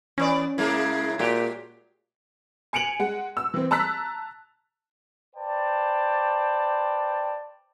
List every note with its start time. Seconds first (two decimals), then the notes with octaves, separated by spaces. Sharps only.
0.18 E3 B3 C#4 D5
0.58 C#3 G#3 A#3 E4
1.19 A#2 G#3 F#4 G4
2.73 G#5 C#7 D7 F7 F#7
2.99 G#3 F#5
3.37 E6
3.54 E3 C4
3.71 A5 A#5 E6 F#6 B6
5.36 B4 C5 D5 G5 A5